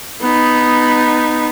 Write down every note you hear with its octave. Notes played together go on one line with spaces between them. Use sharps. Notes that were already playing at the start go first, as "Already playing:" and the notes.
B3 D#4